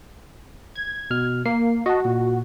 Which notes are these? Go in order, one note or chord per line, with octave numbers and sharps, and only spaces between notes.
G#6
B2 F6
A#3 C7
F#4 D#5 A5
A#2